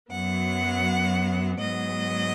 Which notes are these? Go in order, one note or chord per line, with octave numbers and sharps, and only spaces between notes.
F#2 F#3 B3 F#5
G#2 F#3 B3 D#5